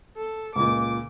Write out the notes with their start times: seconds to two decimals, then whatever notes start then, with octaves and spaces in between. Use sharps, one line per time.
0.17 A4
0.56 C#2 A#2 D6